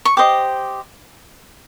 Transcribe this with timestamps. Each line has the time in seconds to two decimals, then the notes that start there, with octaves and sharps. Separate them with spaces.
0.05 C#6
0.17 G4 C5 D#5 D6